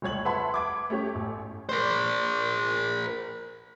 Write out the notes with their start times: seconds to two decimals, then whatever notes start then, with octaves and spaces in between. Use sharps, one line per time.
0.02 F1 C#2 C#5 G#6 F#7
0.25 B4 E5 F#5 A5 B5 C6
0.54 D6 G#6 D7
0.90 A3 C#4 G4 C#5
1.15 A1
1.69 A#4 C5